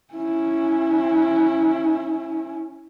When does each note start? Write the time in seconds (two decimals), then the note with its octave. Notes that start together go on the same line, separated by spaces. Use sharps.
0.14 C#4 E4